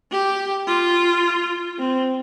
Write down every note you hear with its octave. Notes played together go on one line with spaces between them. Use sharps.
G4
F4
C4